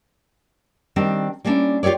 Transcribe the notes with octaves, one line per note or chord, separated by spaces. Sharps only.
D#3 G3 C4 D4
G3 A#3 C#4 D4 E4
F4 G4 A4 C#5 D5